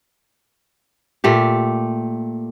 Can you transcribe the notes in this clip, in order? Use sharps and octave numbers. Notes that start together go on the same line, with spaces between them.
A#2 A3 G4